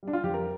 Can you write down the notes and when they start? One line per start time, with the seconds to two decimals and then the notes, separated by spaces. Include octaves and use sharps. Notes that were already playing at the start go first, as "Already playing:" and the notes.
0.03 G3 D4
0.13 F4
0.23 F2 G4
0.34 A#4